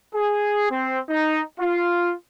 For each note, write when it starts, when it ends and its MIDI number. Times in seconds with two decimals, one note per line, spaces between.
0.14 0.67 68
0.71 1.00 60
1.08 1.41 63
1.60 2.13 65